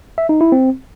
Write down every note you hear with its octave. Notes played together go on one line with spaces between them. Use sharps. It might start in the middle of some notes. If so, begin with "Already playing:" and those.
E5
D#4
E4
C4